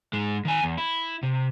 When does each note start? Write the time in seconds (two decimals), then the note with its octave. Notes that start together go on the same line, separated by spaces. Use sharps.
0.13 G#2 G#3
0.45 D#3 G#5
0.63 E2
0.78 E4
1.23 C3